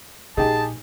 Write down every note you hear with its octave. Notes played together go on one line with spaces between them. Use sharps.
A#1 A#2 D#4 G4 G#4 A5